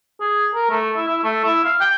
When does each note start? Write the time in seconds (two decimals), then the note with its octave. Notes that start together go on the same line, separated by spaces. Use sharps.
0.21 G#4
0.55 A#4
0.70 A3
0.96 E4
1.08 E4
1.24 A3
1.44 E4
1.64 F5
1.81 G5